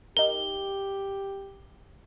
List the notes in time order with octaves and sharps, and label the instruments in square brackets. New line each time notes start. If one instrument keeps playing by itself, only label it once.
[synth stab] D#4 A#4 [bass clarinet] G4 [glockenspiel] G7